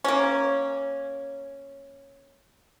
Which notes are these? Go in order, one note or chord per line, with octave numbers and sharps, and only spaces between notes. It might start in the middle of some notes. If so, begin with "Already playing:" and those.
A#3 C#4